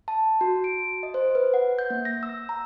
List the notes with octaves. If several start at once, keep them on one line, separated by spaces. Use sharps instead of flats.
A5
F#4
D7
D#5
C5
B4
F#5
G6
A#3
A#6
E6
A#5